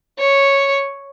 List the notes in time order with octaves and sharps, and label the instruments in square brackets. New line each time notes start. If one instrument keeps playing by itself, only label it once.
[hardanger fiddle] C#5